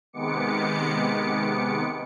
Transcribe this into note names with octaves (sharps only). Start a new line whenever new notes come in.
C3 D#3 G#3 B3 D6 C#7